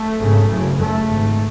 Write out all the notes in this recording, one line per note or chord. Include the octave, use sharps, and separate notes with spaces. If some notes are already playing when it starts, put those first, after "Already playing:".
Already playing: A3
G#1 F#2 C#3
F#1 F#2 C#3
F#1 F#2 C#3 A3
G#1 G#2